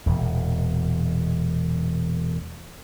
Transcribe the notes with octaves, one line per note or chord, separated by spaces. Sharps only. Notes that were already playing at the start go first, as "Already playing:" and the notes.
E1 E2 A#2